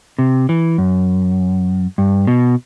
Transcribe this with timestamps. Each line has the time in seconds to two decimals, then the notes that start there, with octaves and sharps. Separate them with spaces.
0.19 C3
0.49 E3
0.78 F#2
1.98 G2
2.27 B2